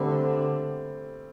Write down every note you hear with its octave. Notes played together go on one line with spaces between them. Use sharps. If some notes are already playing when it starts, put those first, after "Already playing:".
Already playing: D3 G3 A3 C4